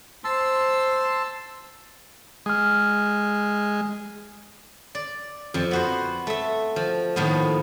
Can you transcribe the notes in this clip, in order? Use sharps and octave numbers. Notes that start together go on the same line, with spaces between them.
C5 A5 C6 E6
G#3 D#6 F6
D5
F2 F3
B3 F#4 C5
A3 E5
F3
A2 D#3 F3 A#3 B3